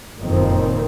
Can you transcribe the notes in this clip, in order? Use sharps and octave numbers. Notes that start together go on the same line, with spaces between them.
F#1 F2 A#2 D#3 C4